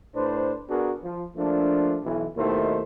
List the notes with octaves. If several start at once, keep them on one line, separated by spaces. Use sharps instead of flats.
A2 D4 B4 C5
B3 D4 F#4 G#4 A#4
F3
F3 A3 A#3 D4
B1 E3
D#2 B2 D#3 A3 E4 C5